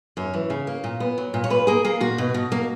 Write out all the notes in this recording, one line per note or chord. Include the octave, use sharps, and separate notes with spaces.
F#2 C#5
E3
C#3
A#3
A#2
B3
F#3
A#2
C#5
A#2 B4
A#3 G#4
A#3 G#4
A#2 F#4
B2
B2
A#3